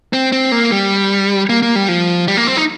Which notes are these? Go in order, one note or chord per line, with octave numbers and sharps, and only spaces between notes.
C4
C4
A#3
G3
A#3
A#3
G3
F3
G3
A#3
C4
D#4